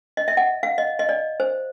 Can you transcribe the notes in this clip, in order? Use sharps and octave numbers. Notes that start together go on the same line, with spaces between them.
D#5
E5
F#5
F5
D#5
D#5
D5
C5